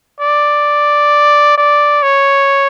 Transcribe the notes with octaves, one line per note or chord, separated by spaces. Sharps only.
D5
D5
C#5